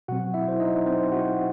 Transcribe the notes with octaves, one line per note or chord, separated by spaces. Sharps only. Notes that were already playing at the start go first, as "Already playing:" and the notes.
B2 F#3 C4 F#4 F#5
E4 E5
C5
D#4 D#5
C4 C5
F#4 F#5